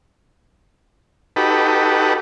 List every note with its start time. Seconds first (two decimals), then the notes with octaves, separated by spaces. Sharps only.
1.36 D#4 F#4 G4 A4 B4